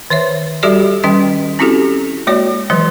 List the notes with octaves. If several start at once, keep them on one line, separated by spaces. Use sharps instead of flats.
D#3 C5 C#5 E5
G3 F#4 G4 A4 D5 E5
D#3 G3 C#4 D#5 G5
C4 C#4 E4 F#4 G4 A4
G#3 A#3 F#4 C#5 D5
D#3 E3 F#3 G#3 B4